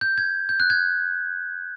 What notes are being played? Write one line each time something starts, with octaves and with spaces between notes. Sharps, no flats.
G6
G#6
G6
F#6
G#6